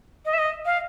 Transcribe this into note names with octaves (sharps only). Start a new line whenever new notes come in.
D#5
E5
D#5
F5